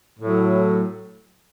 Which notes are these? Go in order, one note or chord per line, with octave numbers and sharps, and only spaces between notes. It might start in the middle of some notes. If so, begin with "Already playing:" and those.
A2 F#3